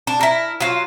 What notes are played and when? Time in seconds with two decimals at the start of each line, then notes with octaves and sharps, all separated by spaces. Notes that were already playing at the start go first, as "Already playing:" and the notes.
0.07 D4
0.21 E4 A#4
0.60 F#3 F4